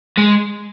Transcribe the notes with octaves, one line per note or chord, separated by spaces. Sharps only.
G#3